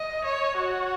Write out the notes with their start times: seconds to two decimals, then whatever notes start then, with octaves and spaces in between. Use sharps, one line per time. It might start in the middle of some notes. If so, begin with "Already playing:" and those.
Already playing: D#5
0.24 C#5
0.58 F#4